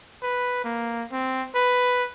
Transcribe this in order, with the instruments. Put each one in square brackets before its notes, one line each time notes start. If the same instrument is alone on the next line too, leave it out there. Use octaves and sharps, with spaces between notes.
[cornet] B4
A#3
C4
B4